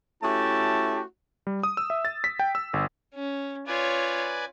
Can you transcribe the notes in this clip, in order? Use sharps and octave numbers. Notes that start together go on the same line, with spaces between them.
A3 C#4 E4 F#4 G4 A5
G3
D#6
E6
E5
A6
B6
G5
E6
G1
C#4
F4 B4 C#5 D5 G#5